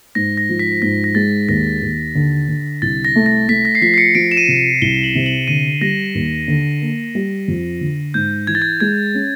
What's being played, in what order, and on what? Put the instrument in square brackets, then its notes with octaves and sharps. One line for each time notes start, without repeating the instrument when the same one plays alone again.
[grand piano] G#2 [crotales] A#6
[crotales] A#6
[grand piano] F3
[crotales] B6
[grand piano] G#2 [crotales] A#6
[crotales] A#6
[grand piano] G#3 [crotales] A6
[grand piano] D#2 [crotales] A#6
[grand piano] D#2
D3
D3
[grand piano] C2 [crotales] A6
[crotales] A#6
[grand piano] A3
[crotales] A#6
[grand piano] A3 [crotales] B6
[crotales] A#6
C7
[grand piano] F3 [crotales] B6
[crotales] C7
C#7
[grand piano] F3 [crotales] D7
[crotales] E7
D#7
[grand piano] C3
[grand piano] C2 [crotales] G7
[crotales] F#7
[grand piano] C3
[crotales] F#7
[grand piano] D3 [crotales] D#7
[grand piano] G3 [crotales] A#6
[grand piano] D#2
D3
A#3
G3
F2
D3
[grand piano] G#2 [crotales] G6
[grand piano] E3 [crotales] G#6
[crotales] A6
G#6
[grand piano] G#3 [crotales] G#6
[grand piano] C#4